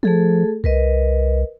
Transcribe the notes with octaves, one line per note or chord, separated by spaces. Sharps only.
F3 A3 G#4 A4
C2 A#4 B4 D#5